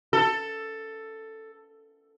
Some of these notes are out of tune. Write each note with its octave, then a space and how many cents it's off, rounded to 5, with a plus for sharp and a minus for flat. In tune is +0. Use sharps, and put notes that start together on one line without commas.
A4 +10